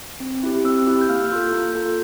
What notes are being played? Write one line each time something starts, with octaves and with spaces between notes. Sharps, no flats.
C4
E4 G4
C4 E6
E4 G4
G6
A#3 F6
E6
F4 A4 E6
G6
A#3 A#5
F4 A4